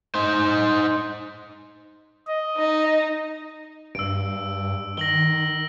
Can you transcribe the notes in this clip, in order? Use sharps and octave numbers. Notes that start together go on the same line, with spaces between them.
D#4 C5
D#5
D#4
G2 E6 D7
D#3 A#6 F#7 G7